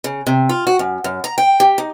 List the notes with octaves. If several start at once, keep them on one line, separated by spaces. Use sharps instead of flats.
C#3
C3
F4
F#4
F#2
F#2
A#5
G5
G4
D#4